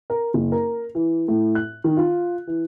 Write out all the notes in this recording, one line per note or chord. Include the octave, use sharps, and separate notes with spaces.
A#4
F#1
A#4
E3
A2
F#6
D#3
F4
E3